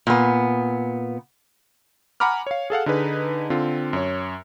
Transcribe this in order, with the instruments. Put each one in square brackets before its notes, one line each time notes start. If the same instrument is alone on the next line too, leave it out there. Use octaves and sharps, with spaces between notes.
[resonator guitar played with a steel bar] A#2 B3
[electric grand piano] F#5 G#5 A#5 B5 D6 F6
C#5 F5
G#4 A4 F5 F#5
D3 D#4 G#4 B4
D3 C4 F4
F#2 C#5